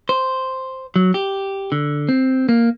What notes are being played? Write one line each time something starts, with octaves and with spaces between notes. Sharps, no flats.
C5
F#3
G4
D3
C4
A#3